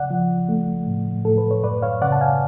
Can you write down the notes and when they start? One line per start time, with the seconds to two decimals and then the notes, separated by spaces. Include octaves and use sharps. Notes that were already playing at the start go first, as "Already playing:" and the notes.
Already playing: C#3 D5 F#5
0.11 F3
0.49 A3
0.87 A2
1.25 A2 A4
1.38 B4
1.51 C#5
1.63 F#2 B4 D5
1.82 C#5 F5
2.01 C#3 D5 F#5
2.12 A5
2.21 F5 G#5